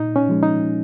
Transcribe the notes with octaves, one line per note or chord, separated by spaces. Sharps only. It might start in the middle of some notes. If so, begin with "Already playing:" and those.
Already playing: A#2 D#4
C#4
F3 G#3
D#4